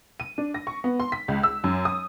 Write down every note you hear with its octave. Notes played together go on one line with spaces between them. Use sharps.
D#7
D4
A#6
C#6
B3
C6
B6
C#2
E6
F#2
D#6